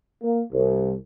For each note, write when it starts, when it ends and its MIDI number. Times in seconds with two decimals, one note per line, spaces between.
0.22 0.41 58
0.53 0.93 36